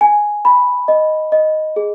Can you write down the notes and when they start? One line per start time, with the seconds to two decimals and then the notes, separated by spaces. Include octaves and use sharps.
0.01 G#5
0.45 B5
0.88 D#5
1.32 D#5
1.76 G#4